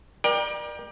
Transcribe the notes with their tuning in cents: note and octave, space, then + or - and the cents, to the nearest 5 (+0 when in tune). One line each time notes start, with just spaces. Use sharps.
A#4 +35 D5 +30 G5 +15